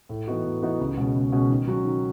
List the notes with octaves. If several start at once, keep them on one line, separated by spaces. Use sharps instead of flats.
A2
E3 B3 D#4 F#4
A2
E3 B3 D#4 F#4
C#2
B2 G#3 C#4 F#4
C#2
B2 G#3 C#4 F#4
D#3
F#3 C#4 F#4
D#3